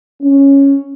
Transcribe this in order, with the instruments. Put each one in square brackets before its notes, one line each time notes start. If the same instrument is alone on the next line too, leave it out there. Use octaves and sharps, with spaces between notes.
[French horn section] C#4